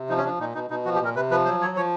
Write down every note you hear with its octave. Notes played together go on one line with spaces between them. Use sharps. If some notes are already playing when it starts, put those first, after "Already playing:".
Already playing: C3
F3 D#4
C#4
F3 D4
A#2 D#4
B2 D#4
B2 D#4
F3 F#4
G4
A#2 A#4
C3 B4
F3 B4
F#3 C5
F#3 C#5
F3 C#5